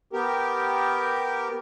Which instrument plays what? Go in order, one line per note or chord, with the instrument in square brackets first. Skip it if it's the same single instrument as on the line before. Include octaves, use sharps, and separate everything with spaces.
[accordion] B3 G4 A#4